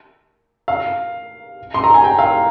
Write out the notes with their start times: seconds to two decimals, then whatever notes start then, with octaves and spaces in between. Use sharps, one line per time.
0.68 F5
1.74 C6
1.84 A#5
1.94 G#5
2.04 G5
2.19 F5